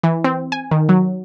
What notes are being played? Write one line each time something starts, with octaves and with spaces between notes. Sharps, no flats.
E3
C4
G#5
D#3
F#3